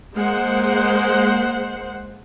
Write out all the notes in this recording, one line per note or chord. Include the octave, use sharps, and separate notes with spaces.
G#3 A#3 C5 F#5